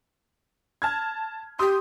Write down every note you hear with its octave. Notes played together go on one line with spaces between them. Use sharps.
A5 F6 G#6
G4 C6 D#6